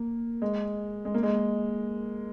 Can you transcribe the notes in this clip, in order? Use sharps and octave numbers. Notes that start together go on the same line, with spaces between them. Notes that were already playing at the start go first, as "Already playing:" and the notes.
Already playing: A#3
G#3
G#3
A#3
G#3